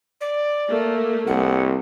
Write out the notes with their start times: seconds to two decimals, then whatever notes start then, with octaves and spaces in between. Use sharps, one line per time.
0.20 D5
0.71 A3 A#3
1.27 C2 F#5